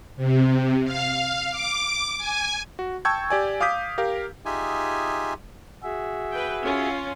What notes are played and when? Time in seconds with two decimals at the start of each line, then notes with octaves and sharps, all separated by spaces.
0.16 C3
0.84 F5
1.50 D6
2.17 G#5
2.79 F#4
3.05 G5 A5 C#6 E6 G6 G#6
3.30 G4 D5 G#5
3.61 F5 D6 D#6 G6 B6
3.98 G4 A#4 F5
4.45 D#4 F4 G4 G#4 E5 G#5
5.83 F#4 G#4 E5
6.31 B4 G5
6.63 C#4 F4